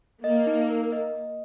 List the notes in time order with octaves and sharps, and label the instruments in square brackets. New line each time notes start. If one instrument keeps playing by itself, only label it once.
[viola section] A#3 [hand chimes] D#5
[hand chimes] D#4
A#4
D#5
D#5